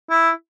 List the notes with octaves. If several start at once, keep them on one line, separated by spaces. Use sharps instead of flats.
E4